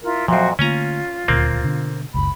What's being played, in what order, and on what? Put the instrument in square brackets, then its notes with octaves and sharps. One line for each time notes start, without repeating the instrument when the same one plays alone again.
[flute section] E4 F4 A#4
[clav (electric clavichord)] F2 A#2 [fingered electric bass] F3 F#3 [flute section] F#4 C5 E5
[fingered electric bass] D3 A3 A#3 [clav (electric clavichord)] C#4 G#5 A#5 [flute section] F4
[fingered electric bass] D#1 D2 A#2 [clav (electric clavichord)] A#3 C4
[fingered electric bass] B2 D3
[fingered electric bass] F#1 C#2 [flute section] B5